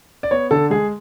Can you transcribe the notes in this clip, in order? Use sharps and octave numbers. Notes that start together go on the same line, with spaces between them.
D5
B3 C#5
D3 A4
G#3 G#4